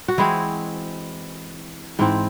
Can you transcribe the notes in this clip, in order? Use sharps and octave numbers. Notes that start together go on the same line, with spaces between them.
F#4
E3 G#3 C4 E4 G#4
G#2 E3 C4